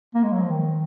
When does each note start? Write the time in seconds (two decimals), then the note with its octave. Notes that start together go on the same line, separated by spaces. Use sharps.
0.14 A#3
0.23 G#3
0.32 F#3
0.41 F3
0.50 D#3